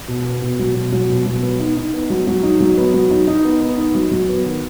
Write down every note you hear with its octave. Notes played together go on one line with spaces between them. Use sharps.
B2
B3
B2
F#3
B2
F#3
B2
F#3
B3
D#4
D#4
B3
F#3
F#3
D#4
F#3
B3
F#3
D#4
D#4
B3
B3
D#4
F#3
F#3
B3
D#3